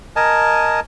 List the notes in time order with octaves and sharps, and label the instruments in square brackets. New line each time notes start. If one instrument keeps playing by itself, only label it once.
[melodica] A#4 D#5 G#5 A5